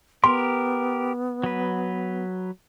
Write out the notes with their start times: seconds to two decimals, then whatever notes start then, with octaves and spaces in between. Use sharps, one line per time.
0.24 B3 G4 A#4 C6
1.44 F#3 B4